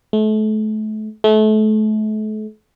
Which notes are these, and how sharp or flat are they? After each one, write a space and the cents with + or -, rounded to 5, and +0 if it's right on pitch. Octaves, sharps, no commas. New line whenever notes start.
A3 -35
A3 -35